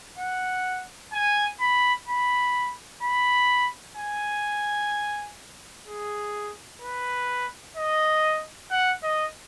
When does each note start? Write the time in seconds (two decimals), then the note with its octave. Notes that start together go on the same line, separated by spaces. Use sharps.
0.18 F#5
1.13 G#5
1.60 B5
2.08 B5
3.03 B5
3.97 G#5
5.87 G#4
6.82 B4
7.77 D#5
8.71 F#5
9.03 D#5